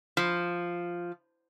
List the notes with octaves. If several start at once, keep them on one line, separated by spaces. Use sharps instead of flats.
F3